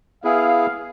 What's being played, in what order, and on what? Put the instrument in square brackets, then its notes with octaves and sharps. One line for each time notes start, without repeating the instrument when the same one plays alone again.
[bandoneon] B3 E4 G#4 [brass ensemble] F5